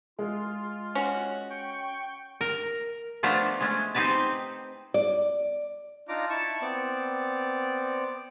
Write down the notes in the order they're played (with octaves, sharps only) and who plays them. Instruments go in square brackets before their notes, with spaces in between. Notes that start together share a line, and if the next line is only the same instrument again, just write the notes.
[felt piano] G#3 [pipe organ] F4
[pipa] C#4 F#4
[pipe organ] G5 C#6
[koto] A#4
F3 A3 B3 D4 A5 A#5
G#3 A3 C#4
C4 D#4 G4 B4 A5
[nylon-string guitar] D5
[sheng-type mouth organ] D4 D#4 F4 A#5 D6
E4 A5 C#6
B3 C4 D5